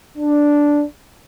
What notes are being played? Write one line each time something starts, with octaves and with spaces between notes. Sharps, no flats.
D4